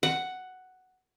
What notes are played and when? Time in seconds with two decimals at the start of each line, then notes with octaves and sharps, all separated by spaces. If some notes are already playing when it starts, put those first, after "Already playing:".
0.03 F#5